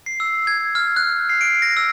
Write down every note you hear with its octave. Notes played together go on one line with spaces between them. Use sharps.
C7
E6
G#6
F6
F#6
C7
D7
A#6
E6